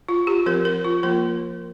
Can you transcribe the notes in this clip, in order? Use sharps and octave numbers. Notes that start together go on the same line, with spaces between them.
F4
G4
F3 C4 A#4
A#4
F4
F3 A#3 A#4